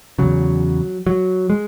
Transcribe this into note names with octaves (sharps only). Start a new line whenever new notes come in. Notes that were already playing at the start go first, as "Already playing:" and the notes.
E2 C#3 F#3
F#3
G#3